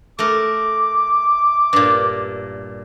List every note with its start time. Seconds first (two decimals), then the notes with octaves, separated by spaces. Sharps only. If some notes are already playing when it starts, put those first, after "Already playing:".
0.19 A3 A#4 D6
1.73 G2 A#2